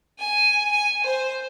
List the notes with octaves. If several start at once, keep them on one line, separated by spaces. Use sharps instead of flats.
G#5
G#5
C5